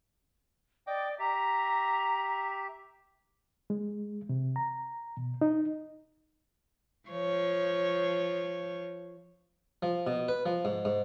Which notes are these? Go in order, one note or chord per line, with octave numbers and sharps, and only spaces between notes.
D5 D#5 G5 D6
G4 E5 A#5
G#3
C3
A#5
B2
D#4
F3 C#5
F3
B2
B4
F3
G#2
G#2